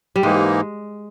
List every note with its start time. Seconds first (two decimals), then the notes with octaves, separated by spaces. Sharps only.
0.16 G3
0.23 G#2 E3 G#3 A#3 D#4